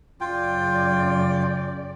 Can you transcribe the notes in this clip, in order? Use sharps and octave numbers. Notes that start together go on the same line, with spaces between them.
F#2 C#3 F4 D5 G5